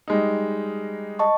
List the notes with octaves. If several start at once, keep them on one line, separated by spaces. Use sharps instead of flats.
G3 G#3 D#4
D#5 A5 C#6